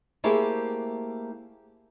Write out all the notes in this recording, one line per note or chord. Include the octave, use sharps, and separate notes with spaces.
A3 A#3 E4 G4 G#4 C5